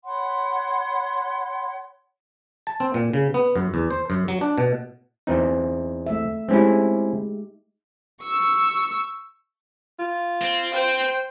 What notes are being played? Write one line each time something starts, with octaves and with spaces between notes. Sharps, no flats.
C#5 F#5 B5 C6
A5
C4
A#2
C#3
B3
F#2
E2
C5
F#2
F#3
D4
B2
E2 C4 D#4
A3 E5
G#3 C4 C#4 D#4 E4 G4
C#6 E6
F4
C4
C5 G5